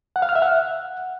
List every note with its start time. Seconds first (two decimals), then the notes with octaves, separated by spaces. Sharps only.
0.16 F#5
0.22 F5
0.29 F6
0.35 E5
0.42 F#5